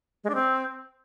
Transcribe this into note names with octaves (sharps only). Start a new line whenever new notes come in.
G#3
D4
C4